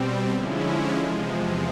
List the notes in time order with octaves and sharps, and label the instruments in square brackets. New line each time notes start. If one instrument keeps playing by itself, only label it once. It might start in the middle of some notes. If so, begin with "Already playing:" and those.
Already playing: [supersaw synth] B2 G3 C4
D3 F3 G#3 C#4 E4
E2 C3 F3 G#3